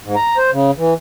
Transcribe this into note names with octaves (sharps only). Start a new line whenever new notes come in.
G#2
A#5
C5
C#3
E3